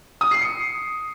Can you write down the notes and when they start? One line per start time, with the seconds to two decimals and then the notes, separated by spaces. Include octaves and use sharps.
0.21 D#6
0.31 C7
0.41 C#7